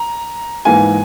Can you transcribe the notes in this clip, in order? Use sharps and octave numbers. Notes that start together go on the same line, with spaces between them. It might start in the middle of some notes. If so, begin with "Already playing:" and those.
Already playing: A#5
G#2 E3 A#3 G#5